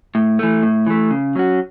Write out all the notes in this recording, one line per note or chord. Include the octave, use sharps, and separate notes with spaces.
A2
E3 A3
A2
E3 A3
C#3
F#3 C#4 F#4